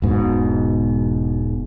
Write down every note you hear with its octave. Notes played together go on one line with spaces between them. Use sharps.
E1 G#2 B2